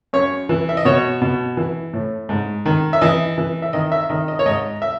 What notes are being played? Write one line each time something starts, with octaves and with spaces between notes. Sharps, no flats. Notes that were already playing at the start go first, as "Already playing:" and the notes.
F#2 C#5
E3
E5
D#5
B2 C#5
B2
E3
A2
G#2
D#3
E5
E3 D#5
E3
E5
D#3 D#5
E5
D#3 D#5
D#5
C#5
G#2 D#5
E5